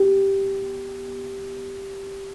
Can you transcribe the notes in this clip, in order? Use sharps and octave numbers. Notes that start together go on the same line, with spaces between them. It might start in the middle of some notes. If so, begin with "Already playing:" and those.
Already playing: G4